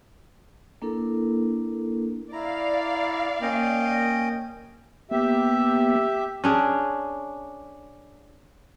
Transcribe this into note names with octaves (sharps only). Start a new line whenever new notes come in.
A#3 D4 E4 A4 A#4
E4 D5 F5 A#5
A#3 C#4 D#5 G5
A#3 B3 G4 E5
C#4 D4 G#4